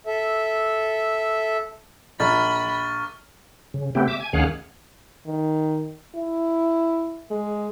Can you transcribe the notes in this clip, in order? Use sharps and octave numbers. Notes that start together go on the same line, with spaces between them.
A4 E5
A#1 B5 C#6 F6 A6
C#3
C#3 A3 B3 C4 G4
E5 D6
G#5
D2 D#3 C#4 G#4 F5 F#5
D#3
E4
G#3